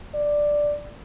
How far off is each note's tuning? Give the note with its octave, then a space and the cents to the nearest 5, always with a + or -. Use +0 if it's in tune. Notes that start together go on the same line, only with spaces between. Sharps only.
D5 +5